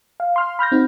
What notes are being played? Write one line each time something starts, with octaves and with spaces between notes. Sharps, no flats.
F5
C6 F6
B5 F6 G6 A#6
C4 D#4 F#4